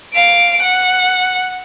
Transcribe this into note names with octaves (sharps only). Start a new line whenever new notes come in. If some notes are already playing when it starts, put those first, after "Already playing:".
F5 D7
F#5